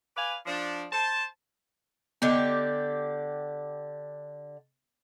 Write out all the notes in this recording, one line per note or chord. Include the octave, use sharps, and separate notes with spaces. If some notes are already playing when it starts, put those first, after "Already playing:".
B4 D5 F5 G#5
F3 D4
C5 A5
D3 B3 G4 D#5